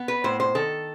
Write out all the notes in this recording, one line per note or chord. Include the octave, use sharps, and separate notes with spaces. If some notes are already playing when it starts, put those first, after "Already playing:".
Already playing: B3
B4
A2 C5
C5
D#3 A4